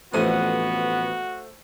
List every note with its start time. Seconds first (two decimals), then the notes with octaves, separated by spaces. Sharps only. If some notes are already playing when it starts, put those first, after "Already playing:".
0.14 A1 F2 A3 B3 F#4 C5 G#5 D#7